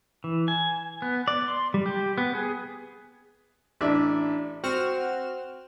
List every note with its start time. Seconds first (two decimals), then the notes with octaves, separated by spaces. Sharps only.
0.24 E3
0.48 G#5
1.02 B3
1.28 D5
1.48 C6
1.74 G3
1.86 G4
2.18 B3
2.35 G#4
3.81 A1 D4 E5
4.64 C4 F#4 F6 E7